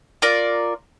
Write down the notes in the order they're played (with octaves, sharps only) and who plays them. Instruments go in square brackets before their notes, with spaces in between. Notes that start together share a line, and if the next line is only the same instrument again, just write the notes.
[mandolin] F4 A#4 D5